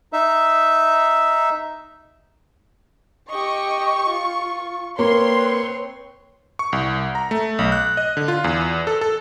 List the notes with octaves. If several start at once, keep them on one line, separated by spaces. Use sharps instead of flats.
D#4 E5
G4 D#5 C#6
F4
A#3 C4 B4 C#5 C6
C#6
C2
A#5
A3
B1
F#6
D#5
D3
F4
E2
A4
A4